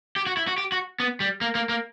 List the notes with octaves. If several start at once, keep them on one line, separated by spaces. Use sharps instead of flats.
G4
F#4
E4
F#4
G4
F#4
B3
G3
A#3
A#3
A#3